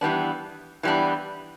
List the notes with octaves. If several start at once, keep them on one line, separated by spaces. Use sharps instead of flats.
E3 G3 B3 D4
E3 G3 B3 D4